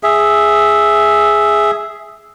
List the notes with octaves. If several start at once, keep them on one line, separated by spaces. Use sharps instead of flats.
G#4 E5